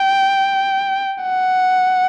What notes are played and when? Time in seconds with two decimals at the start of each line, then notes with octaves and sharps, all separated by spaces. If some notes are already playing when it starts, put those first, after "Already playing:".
Already playing: G5
1.23 F#5